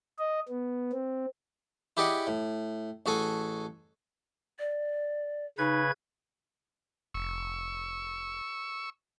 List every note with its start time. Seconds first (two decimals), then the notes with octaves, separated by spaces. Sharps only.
0.18 D#5
0.49 B3
0.92 C4
1.97 E4 G4 G#4 D5 D#5 F#5
2.27 A2
3.06 A1 F#4 G#4 A4 G#5
4.59 D5
5.58 C#3 D#4 B4 G#6
7.14 F1 C#6 E6